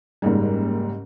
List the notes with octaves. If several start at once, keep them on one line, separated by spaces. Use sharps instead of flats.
F#1 G#2 G3